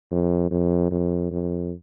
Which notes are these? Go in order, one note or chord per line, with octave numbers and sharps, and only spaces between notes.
F2
F2
F2
F2